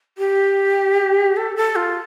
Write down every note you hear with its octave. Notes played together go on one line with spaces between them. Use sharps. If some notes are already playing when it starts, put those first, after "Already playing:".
G4
A4
A4
F4